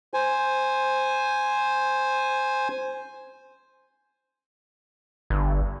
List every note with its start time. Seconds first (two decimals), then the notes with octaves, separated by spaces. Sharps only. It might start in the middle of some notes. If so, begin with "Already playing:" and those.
0.14 C5 G#5
5.30 G1